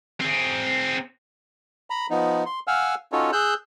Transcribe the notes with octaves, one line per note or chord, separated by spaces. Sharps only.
C4 G#4
A#5 B5
F3 B3 D#4
C6
F5 F#5 G#5 E6 F6
C#4 D#4 F4 F#4 A4 C#5
G#4 E6 F#6 G6